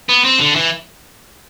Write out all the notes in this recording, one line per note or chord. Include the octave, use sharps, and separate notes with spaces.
B3
C4
D3
E3